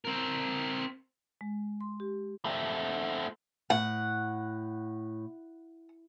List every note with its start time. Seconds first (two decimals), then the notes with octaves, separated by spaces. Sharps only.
0.05 C4 A#4
1.41 G#3
1.81 C6
2.00 G4
2.45 A3 C4
3.70 A2 F#5